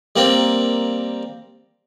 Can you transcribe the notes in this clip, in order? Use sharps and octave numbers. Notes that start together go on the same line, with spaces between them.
G3 A#3 C4